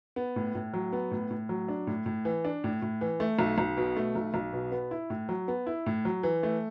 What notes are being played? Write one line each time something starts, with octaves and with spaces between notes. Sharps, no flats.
B3
A2
A2
F#3
B3
A2
A2
F#3
D4
A2
A2
E3
D4
A2
A2
E3
A3
B1
B1
B2
A3
B1
B1
B2
B3
E4
A2
F#3
B3
E4
A2
F#3
E3
A3